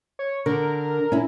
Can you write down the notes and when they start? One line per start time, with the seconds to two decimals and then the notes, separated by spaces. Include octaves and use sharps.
0.19 C#5
0.46 D3 A#4
1.12 C#4 E4